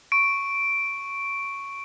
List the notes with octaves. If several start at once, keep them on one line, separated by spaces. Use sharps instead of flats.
C#6 D7